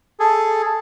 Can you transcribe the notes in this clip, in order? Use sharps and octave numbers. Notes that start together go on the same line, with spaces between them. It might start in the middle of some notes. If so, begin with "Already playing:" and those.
G#4 A4